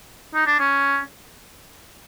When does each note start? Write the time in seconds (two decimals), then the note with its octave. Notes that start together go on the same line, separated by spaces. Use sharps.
0.34 D#4
0.47 D4
0.59 C#4